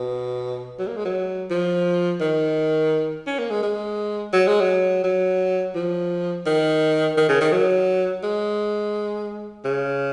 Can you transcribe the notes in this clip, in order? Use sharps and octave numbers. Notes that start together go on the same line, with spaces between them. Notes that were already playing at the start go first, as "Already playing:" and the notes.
Already playing: B2
F#3
A#3
G#3
F#3
F3
D#3
C#4
A#3
G#3
G#3
F#3
G#3
F#3
F#3
F3
D#3
D#3
C#3
D#3
F#3
G#3
C#3